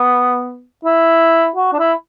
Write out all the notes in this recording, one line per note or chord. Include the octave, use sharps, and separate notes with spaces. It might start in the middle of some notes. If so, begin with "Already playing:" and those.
Already playing: B3
E4
F#4
D4
E4